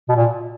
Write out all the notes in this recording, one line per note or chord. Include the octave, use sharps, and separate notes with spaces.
B2
A#2